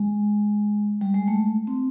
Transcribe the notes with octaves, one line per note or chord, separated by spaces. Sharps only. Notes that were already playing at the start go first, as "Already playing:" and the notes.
Already playing: G#3
G3
G#3
A3
C4